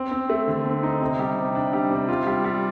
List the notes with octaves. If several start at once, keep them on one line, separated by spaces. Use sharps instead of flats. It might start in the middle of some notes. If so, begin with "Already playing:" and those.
Already playing: C4
C4
A3
D3
C4
D#4
C3
G3
C3
D4
G3
C3
F4
G3
G3